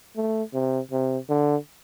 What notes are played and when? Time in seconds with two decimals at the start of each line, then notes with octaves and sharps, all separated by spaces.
0.16 A3
0.54 C3
0.92 C3
1.30 D3